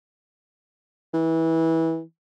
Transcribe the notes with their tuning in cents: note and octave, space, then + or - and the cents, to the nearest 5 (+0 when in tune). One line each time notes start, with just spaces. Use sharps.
E3 -20